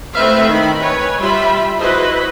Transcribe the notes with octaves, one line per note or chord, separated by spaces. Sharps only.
A3 C4 E4 B4 E5 F5
D#3 B5
B4 C#5 G#5
G3 F4 E5 B5 C6
E4 F#4 B4 C5 D#5